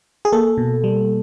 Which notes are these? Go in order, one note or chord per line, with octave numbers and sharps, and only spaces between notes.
G#4
A#3 A4
B2
G3